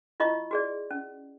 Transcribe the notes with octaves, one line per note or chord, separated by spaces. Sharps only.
E4 F4 D#5 C#6
F#4 G#4 D5
C#4